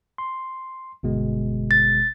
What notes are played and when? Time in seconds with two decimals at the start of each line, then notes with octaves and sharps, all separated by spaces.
0.18 C6
1.03 G1 B2 G#3
1.71 A6